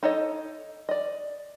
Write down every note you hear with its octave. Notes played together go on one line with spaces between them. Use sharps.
D#4 A4 C#5 D#5
D5 D#5